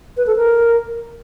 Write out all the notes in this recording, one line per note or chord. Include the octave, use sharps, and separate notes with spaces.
B4
A4
A#4